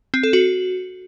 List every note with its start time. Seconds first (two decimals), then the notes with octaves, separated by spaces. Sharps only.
0.14 C4
0.23 A4
0.33 F#4